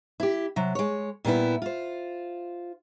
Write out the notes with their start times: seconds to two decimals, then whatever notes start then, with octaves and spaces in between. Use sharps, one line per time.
0.20 E4 G4
0.56 C3 F#3
0.75 G#3 C#5
1.25 A#2 G3 B3 E4
1.62 F4 C5